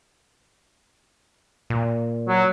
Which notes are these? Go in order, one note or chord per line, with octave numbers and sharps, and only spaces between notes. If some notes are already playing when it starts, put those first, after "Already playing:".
A#2
F#3